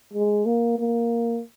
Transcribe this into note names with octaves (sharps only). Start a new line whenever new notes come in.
G#3
A#3
A#3